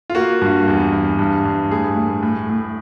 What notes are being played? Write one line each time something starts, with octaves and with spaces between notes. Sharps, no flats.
F4
A#3 F#4
G2
E2
E2
G2
G2
A2 G#4
A2
A2
A2